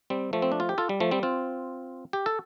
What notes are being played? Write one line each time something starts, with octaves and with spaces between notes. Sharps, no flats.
G3 C4
F3 A3
C4
D4
F4
G4
F4 A4
G3
F3 A3
G3 C4
C4 F4
G4
A4